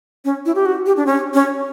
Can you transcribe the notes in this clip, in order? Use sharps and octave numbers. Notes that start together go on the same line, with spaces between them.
C#4
E4
G4
F#4
G4
D4
C#4
C#4